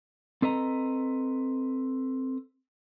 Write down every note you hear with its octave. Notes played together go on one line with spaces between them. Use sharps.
C4 A4 B4 D#5 A#5